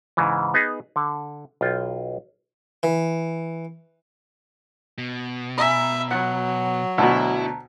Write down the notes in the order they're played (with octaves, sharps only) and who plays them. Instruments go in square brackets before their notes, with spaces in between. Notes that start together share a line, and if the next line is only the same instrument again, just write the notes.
[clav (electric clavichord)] G#2 C#3 E3
B3 D#4 G#4
D3
B1 F4 G5
[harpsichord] E3
[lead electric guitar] B2
[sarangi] E5 [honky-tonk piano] G#5 A#5 B5
[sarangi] F#3 [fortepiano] F#5
[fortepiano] D2 B2 [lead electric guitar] E4 [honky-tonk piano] A5 A#5